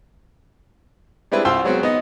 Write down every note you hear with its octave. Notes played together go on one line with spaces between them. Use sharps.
G3 G#3 C4 D4 E4 B4
C2 F4 C5 G5 C6 E6
F#3 G#3 B3 C4 F#4
B3 D#4 D#5